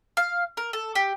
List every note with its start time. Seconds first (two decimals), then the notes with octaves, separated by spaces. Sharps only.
0.17 F5
0.57 A#4
0.73 A4
0.95 G4